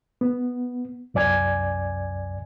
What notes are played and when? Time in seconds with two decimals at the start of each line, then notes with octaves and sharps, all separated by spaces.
0.21 B3
1.14 C2 F#2 D5 G#5 G#6